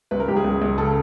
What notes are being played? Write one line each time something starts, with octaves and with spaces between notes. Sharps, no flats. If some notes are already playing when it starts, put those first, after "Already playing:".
C#2 B4
A#4
C#2 G4
G#4
C#2
C#2
C#3 A4